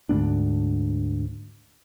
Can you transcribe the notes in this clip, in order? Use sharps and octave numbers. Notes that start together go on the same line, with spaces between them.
D2 G#2 B3 D4